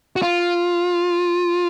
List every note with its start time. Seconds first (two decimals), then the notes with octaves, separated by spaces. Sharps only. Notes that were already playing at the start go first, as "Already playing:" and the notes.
0.16 F#4
0.22 F4